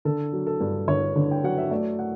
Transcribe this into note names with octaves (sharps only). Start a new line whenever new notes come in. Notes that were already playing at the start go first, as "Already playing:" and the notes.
D3 A4
F#3
A4
G2
G1 C#5
D3
G5
F#3 F#5
E5
A3 D5
F#5